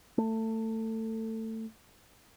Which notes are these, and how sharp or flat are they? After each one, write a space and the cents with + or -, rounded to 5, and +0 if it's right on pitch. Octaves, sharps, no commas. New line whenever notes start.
A3 +20